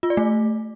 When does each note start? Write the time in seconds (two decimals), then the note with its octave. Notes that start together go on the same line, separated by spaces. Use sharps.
0.03 F4
0.10 D5
0.17 A3